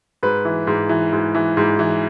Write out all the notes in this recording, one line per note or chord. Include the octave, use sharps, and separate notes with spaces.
G#2 B4
E3
G#2
E3
G#2
E3
G#2
E3